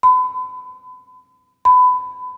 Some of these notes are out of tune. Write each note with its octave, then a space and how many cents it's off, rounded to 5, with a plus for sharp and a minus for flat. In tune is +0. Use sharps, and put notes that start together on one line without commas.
B5 +40
B5 +25